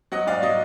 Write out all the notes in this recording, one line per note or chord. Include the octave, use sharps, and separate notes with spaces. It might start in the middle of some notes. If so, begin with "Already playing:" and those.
F#3 D#5 F#5
G#2 D5 F5
F#3 D#5